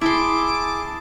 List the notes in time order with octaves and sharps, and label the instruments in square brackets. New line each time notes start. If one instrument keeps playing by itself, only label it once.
[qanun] E4 C6 [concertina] G#4 A5 [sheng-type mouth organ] D6